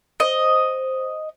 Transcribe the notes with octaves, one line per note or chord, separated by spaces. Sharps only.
C5 D#5